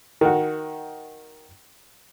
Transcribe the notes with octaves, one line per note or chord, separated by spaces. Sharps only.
D#3 F#4